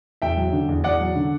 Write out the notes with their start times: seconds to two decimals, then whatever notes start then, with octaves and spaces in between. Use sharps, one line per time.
0.22 E2 E5 G5
0.37 F#3
0.53 D3
0.69 E2
0.84 E2 D5 F#5
1.00 F#3
1.16 D3